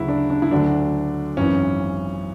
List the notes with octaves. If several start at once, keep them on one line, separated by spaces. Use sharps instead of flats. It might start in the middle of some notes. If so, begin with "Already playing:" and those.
Already playing: D2 C#3 F#3 E4 F#4
D4
D4
E4
D2 D3 F#3 D4
G#1 F#2 E3 C#4